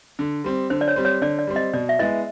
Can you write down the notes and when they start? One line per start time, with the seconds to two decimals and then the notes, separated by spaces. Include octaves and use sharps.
0.19 D3
0.44 G3 C4
0.70 D3 C5
0.81 D5
0.88 C#5
0.96 G3 C4
1.05 C#5
1.21 D3 D5
1.39 D5
1.47 G3 C4
1.56 D#5
1.73 B2 D5
1.89 E5
1.99 G#3 B3 E4 D#5